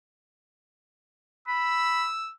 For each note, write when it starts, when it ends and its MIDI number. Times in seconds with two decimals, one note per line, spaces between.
1.48 2.04 83
1.48 2.33 88